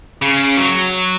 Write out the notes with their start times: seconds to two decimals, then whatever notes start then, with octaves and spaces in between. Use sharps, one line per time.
0.22 C#3
0.57 F#3